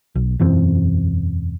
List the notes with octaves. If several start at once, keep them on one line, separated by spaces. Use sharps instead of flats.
B1
E1 F#2 E3 C4